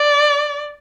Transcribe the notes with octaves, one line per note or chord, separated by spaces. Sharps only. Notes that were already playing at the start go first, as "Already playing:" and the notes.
Already playing: D5